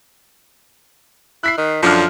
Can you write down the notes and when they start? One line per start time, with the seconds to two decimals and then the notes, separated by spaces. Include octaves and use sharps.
1.44 E4 F#6 B6 C7
1.58 D#3
1.83 F#2 D3 F3 D4 F6